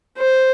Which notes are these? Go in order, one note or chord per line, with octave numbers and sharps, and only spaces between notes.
C5